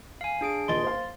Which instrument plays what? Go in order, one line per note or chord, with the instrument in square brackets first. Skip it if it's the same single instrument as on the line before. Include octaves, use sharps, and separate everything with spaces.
[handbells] F5 G#5
D4 G#4 D7
[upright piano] D#1 D#5 G7 [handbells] C6 A6
[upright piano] C5 F5